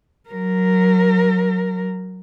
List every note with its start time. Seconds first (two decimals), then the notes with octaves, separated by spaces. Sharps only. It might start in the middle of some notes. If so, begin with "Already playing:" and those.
0.29 F#3 A#4